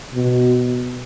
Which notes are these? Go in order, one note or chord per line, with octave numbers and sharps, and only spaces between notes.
B2